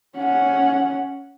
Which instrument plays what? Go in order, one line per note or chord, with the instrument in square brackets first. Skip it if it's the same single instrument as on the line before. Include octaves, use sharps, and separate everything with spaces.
[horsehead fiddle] C#4 F#5